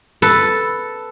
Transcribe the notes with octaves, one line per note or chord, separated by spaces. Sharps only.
A4 B4